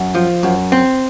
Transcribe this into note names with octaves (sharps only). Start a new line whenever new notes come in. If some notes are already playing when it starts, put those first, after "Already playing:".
Already playing: F#2
F3
F#2
C4